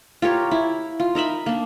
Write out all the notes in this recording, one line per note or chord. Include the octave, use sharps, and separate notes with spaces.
F4 G4 A#4 C#5
E4
F4
D#4 A#4 E5 B5
A#3 D4